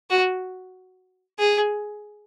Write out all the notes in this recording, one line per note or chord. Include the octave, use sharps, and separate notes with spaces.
F#4
G#4